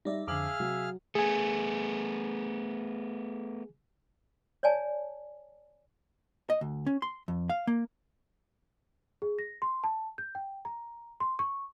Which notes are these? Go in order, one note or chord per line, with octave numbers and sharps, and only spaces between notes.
G3 D#4 D5 E5
F2 D3 G#4 E5 F5 D6 F6 F#7
C3 F#3
A3 B3 G#4 G#5
C#5 D5 G#5 A5
D#5
D2
C#4
C6
F2
F5
A#3
G#4
A#6
C6
A5
G6
G5
A#5
C6
C#6